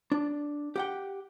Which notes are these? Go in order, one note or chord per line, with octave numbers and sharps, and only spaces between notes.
D4
G4 F#5 G5